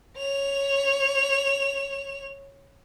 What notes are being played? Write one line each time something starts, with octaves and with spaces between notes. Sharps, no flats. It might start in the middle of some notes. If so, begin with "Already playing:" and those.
C#5 F7